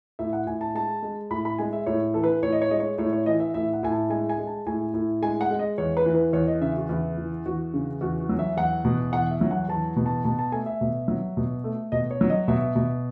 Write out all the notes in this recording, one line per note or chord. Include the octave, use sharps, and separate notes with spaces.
A2 E5
F#5
A2 G#5
A5
G#3 A5
G#3
A2 B5
B5
G#3 G#5
E5
A2 C#5
E3 A4
B4
A2 C#5
D#5
C#5
G#3 D#5
C#5
A2 C#5
C#5
E3 D#5
E5
A2 E5
F#5
A2 G#5
A5
G#3 G#5
G#5
G#3
A5
A2 G#5
A2
G#3 G#5
F#5
G#3
D#5
E2 C#5
B4
E3
B4
E2 C#5
D#5
C#3 E5
F#4
E2 E4
E3
E2 F#4
C#3
E2 F#4
F#4
F#3
E5
E2 F#5
B2
E2 F#5
E5
F#3
F#5
E2 A5
B2
A5
B2 A5
A5
A3 G#5
E5
B2
F#3
B2
A3
B2 D#5
C#5
F#3
D#5
B2 E5
B2